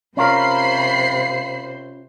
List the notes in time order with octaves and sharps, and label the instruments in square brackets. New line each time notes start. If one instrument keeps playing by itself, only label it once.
[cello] C3 C5 [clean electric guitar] C#4 F4 A#4 [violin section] B5 C7